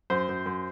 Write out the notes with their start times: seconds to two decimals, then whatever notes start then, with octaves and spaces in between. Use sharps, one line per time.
0.10 F#2 C5
0.29 F#2
0.46 F#2